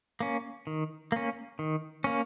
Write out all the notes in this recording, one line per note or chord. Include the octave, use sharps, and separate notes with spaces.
A#3 C#4
D#3
A#3 C#4
D#3
A#3 C#4